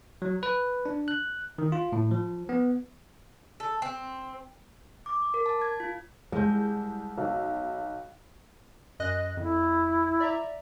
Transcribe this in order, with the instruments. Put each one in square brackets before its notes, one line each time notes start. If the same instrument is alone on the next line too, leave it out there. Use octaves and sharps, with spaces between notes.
[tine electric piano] F#3
B4
D4
F#6
D#3
F4
A2
F3
B3
[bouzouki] A4
C4
[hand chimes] D6
D6
A#4
A5
G#6
F4
[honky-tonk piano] C2 G6 [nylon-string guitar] G#3
[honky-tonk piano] B1
[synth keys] F#2 D#5 F#6
[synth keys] F2 [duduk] E4
[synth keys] D5 E5 A#5